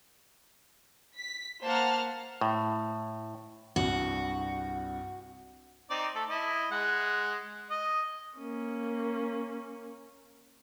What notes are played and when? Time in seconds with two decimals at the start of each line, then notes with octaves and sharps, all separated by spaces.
1.18 B6
1.64 A#3 C5 F#5 A5 F6
2.41 A2
3.76 C2 G2 F#4
5.90 C4 D#4 D5
6.15 A3 A4
6.30 E4 D#5
6.71 G#3 F#5
7.71 D#5
8.38 A#3 C#4